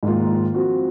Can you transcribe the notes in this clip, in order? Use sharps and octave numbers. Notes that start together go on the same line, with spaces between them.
G#2 D#3 A#3 F4
F3 C4 F#4